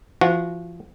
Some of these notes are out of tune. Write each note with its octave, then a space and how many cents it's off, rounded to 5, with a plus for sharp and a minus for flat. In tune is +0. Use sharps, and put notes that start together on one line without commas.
F3 -35 F#4 -25